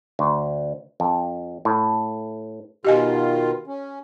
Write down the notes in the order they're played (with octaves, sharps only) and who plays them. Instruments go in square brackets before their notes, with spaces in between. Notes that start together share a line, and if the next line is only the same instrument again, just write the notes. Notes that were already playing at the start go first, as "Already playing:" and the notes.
[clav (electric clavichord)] D2
F2
A2
[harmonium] B2 D#3 F4 [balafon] G4 D#5 G#5
[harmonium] C#4